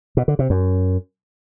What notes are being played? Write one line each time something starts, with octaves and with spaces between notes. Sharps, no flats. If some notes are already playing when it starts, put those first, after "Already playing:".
B2
D3
C3
F#2